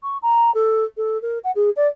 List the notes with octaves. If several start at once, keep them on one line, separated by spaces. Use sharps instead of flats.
C#6
A#5
A4
A4
A#4
F#5
G#4
D5